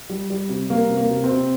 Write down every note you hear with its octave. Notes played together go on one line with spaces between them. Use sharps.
G3
G3
C3
G3 A#3
C3
A#3
C3
C4
C3